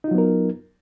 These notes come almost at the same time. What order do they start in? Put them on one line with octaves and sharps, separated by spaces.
D#4 F4 F#3 B3 A#4